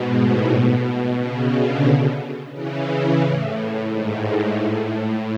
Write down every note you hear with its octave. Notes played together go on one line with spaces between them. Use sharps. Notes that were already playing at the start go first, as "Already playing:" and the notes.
Already playing: G#2 B2
A2
B2
C#3
D3
C#3 E3
A2
G#2
A2